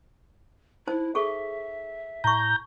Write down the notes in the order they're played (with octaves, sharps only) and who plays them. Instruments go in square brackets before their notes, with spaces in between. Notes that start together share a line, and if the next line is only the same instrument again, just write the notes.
[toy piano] D#4 C5 A5 [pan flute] E4
[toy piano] G#4 A4 C#6 [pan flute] E5
[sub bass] A2 [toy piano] A5 C#6 [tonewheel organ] A#5 G6